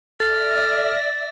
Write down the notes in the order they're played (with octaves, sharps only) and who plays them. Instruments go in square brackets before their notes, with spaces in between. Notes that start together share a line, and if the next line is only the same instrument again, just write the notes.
[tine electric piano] A4 [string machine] D5 E5 A#6 [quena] F6 [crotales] A6